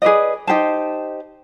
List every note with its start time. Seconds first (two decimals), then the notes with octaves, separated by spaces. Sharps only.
0.02 G#4 B4 D5 D#5
0.47 D#4 G4 C5 A5